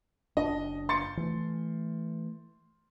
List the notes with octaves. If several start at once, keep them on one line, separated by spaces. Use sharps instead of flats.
F#1 D4 D#5
C6 A6 C#7
E3 A3